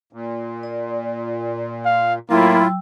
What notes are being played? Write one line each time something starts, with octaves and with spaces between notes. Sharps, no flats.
A#2
D5
F5
A2 F#3 A#3 E4 F4 G5 E6